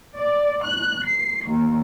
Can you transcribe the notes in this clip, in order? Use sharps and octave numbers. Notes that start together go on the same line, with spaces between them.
D5
F#6
C7
D#2